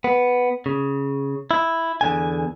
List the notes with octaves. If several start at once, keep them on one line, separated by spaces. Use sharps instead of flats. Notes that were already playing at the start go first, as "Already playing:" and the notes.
B3
C#3
E4
E2 D3 G#5